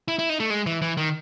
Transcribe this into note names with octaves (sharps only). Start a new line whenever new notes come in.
E4
E4
D#4
A3
G#3
E3
E3
D#3